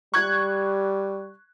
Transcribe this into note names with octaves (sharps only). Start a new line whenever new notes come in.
G3 C#6 F#6 G#6